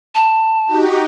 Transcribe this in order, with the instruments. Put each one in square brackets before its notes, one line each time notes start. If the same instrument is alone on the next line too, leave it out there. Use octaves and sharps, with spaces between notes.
[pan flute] A5
[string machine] D#4 F#4 G4